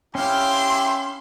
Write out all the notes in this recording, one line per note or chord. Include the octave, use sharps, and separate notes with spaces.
C#4 E4 G4 F5 G5 C6